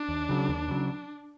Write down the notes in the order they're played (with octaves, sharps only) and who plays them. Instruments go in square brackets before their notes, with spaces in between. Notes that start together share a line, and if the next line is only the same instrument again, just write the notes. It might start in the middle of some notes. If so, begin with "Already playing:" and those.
Already playing: [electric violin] D4
[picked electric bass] D#2
C#3 F#3
D#2
C#3 F#3